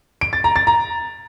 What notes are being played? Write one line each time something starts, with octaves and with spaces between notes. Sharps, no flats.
D7
A6
A#5
A6
A#5